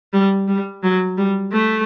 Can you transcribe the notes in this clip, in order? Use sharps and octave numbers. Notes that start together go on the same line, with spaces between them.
G3
G3
F#3
G3
A3